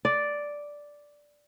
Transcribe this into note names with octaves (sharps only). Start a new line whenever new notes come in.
D5